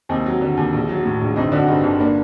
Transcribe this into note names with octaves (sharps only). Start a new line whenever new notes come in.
D#2 C4 D#4
F#3
D3
D#2
A#1
F#3
A2
A#1
G1 C4 D#4
D3 D4 F#4
G2 C4 D#4
G1
A#3 D4